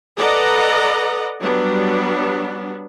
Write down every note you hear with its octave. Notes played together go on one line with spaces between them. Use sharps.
A4 B4 D5 D#5 F#5 A#5
F#3 G3 B3 D4